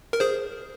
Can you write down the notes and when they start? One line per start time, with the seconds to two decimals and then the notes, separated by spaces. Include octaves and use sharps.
0.13 A#4
0.20 G#4 C5